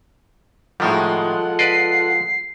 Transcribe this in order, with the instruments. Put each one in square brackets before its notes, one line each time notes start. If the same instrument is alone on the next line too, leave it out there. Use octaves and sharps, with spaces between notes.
[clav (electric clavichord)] A2 D#3 G3 [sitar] F3 G#3 [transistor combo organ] F4 A4 F#5
[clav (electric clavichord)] B4 D5 D#5 [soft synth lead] C7